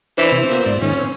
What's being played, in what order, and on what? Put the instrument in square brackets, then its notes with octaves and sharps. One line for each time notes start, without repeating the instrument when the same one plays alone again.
[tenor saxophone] E3 [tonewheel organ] D4 B5 D6 [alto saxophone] C5
[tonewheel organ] C3 E4
[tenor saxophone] A#2 [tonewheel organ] B3 E6
[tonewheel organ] G#2 D5
[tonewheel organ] G#2 D#3 [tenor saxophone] C#4
[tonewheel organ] C4